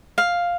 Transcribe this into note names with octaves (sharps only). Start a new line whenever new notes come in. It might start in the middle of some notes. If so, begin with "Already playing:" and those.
F5